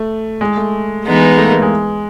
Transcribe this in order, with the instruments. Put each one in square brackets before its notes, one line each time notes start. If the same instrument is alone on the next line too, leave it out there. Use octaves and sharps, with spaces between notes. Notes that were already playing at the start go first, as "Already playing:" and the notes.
Already playing: [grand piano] A3
G#3
A3
[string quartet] E3 G#3 B3 D#4
[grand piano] A3
A#3
A3
G#3